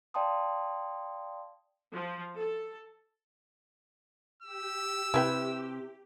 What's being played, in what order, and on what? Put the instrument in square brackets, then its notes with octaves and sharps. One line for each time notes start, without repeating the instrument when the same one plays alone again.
[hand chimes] D5 F5 G5 A5 C6 D#6
[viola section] F3
A4
[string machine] G4 [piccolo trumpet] E6
[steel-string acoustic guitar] C3 [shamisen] E4 B4 G5